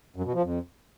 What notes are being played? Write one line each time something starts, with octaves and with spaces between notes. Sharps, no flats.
F#2
B2
F3
F2